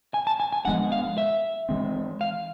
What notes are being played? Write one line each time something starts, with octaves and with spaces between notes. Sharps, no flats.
G#5
A5
G#5
G#5
F3 G#3 B3 D4 F#5
F5
E5
E3 G#3 C4
F5